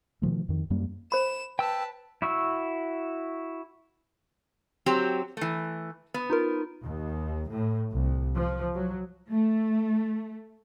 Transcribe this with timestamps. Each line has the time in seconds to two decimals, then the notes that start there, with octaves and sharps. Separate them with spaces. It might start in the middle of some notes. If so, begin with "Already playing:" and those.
0.22 B2 D#3 F3 A3
0.49 F2 D#3
0.70 F#2 G3 A#3
1.12 C5 B5 E7
1.59 B4 G5 A5 E6
2.22 E4 F#4 C#6 E6
4.86 F#3 C4 G4
5.37 E3 A3
6.14 B3
6.30 D#4 F4 A#4
6.81 D#2
7.49 A2
7.92 C2
8.36 F3
8.74 F#3
9.29 A3